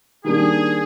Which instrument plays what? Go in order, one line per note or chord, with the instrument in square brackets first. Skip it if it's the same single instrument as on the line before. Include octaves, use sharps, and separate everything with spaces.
[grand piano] D#3 G3 A#3 D4 [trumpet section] G#4